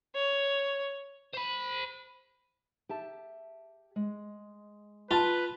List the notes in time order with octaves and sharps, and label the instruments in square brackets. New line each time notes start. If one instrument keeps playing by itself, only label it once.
[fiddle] C#5
[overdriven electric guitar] C5 B5
[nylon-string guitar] G4 E5 A5
G#3
[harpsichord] F4 [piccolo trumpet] B4 [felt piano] A5